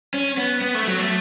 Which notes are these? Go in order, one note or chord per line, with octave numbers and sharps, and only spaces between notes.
C#4
B3
B3
A3
F#3
A3